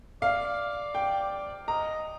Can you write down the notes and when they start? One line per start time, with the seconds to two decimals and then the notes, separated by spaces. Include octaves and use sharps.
0.22 D5 F5
0.95 G5
1.68 D#5 A#5